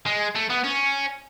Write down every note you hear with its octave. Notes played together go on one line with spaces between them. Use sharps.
G#3
A3
B3
C#4